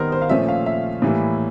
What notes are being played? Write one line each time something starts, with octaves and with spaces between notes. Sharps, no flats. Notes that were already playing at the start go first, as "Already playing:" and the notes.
Already playing: D#3 G3 B3 D#4 A#4 C5
C5
F5
A#2 F3 A3 C#4 E5
F5
E5
A2 E3 G3 A#3